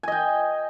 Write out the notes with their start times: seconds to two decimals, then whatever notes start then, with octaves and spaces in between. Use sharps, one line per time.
0.03 G#5
0.08 D#5
0.12 G5